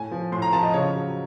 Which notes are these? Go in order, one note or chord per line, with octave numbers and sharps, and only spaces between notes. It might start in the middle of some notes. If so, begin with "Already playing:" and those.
Already playing: A2 G#5
F3
A2 C6
A#5
F3 A5
D#5
C#3 C#5
F#3